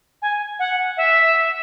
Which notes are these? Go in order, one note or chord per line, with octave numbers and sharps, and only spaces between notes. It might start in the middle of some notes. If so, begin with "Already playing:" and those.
G#5
F#5
E5